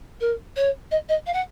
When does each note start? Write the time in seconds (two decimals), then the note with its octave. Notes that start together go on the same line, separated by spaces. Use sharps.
0.20 A#4
0.56 C#5
0.91 D#5
1.09 D#5
1.26 F5
1.33 F#5